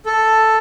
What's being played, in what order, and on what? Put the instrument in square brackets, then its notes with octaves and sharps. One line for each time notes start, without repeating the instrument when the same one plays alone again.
[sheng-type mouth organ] A4